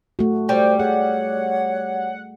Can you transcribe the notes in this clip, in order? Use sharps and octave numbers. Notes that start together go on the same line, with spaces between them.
A3 F#4
G3 C5 G5
G#4 C#5 F#5